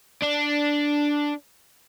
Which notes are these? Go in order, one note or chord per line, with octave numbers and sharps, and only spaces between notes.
D4